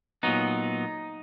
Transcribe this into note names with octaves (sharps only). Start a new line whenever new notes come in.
A#2 F#3 B3 D#4